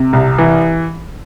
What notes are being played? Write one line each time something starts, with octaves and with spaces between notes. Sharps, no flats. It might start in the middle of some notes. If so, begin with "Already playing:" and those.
Already playing: C3
C2
E3